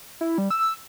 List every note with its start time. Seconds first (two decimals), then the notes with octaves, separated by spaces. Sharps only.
0.21 E4
0.38 G3
0.50 E6